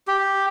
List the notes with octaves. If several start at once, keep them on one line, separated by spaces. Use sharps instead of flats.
G4